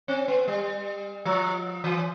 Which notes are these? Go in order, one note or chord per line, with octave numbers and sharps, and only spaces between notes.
C4
B3
G3
F3
E3